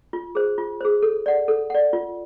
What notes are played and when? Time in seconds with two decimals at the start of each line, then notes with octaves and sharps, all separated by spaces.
0.13 F4
0.35 G#4 C5
0.58 F4
0.81 G#4 C5
1.03 A4
1.26 D5 F#5
1.48 A4
1.70 D5 F#5
1.93 F4